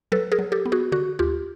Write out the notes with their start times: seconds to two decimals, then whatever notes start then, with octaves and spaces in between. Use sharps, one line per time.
0.12 F#3 A4 B4
0.32 G#4 A#4
0.39 F#3
0.52 G4 A4
0.66 B3
0.72 F#4 G#4
0.92 D3 F#4
1.19 D#2 F4 G4